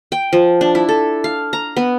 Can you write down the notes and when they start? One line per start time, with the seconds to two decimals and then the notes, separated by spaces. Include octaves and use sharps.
0.12 G5
0.33 F3
0.61 D4
0.75 E4
0.89 A4
1.24 F5
1.53 A#5
1.77 B3